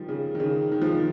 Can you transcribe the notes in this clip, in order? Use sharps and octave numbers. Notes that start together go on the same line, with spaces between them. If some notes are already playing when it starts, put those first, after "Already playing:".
Already playing: D#3 F3 G3
C#3
D#3
C#3
D#3
F3
D#3